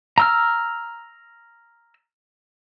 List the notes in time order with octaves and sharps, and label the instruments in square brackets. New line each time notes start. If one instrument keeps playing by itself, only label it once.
[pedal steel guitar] A#5 E6 F6